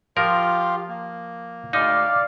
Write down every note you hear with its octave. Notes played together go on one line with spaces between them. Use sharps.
F3 F4 G4 A#4 F5
A#3
D2 G#3 D#4 D5 F5